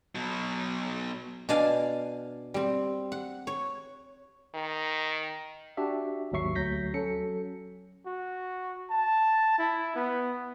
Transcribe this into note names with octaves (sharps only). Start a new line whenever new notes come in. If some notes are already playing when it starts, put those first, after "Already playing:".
B2 F#3
B2 D4 D5 F5 G#5
G3 C4
F#5
C#5
D#3
D4 F#4 G4 E5
G#1 D#2 F#3 E5 C#6 C7
D2 F#3 G6 A#6 B6
F#3 C#4 A4 C#7
F#4
A5
E4
B3